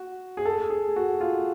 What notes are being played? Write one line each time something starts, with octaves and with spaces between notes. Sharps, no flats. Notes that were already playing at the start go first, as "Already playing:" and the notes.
Already playing: F#4
G#4
A4
G#4
F#4
F4